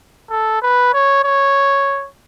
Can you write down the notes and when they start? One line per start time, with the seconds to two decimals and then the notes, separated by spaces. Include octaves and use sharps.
0.31 A4
0.62 B4
0.93 C#5
1.24 C#5